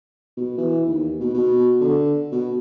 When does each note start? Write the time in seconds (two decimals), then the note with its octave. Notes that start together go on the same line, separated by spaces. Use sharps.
0.37 B2
0.58 E3
0.87 D#2
1.20 B2
1.34 B2
1.81 D3
2.32 B2